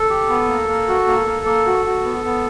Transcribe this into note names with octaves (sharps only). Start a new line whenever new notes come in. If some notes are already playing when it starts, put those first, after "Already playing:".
Already playing: A4
G4
B3
A#3
A#3
F#4
A#3
A#3
A#3
F#4
F#4
B3
B3